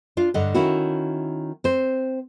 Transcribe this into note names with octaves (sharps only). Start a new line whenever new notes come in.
D4 F4
G2 D3 D#5 F#5
D#3 C#4 E4 F#4
C4 C5